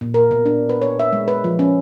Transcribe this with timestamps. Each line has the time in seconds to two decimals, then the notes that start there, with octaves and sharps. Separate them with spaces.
0.01 A#2
0.14 A#4
0.31 B2
0.46 D4
0.69 B4
0.82 C#5
0.99 E5
1.13 G#3
1.28 B4
1.44 F3
1.59 C#4